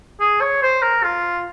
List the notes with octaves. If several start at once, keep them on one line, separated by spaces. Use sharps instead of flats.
G#4
C#5
C5
A#4
F4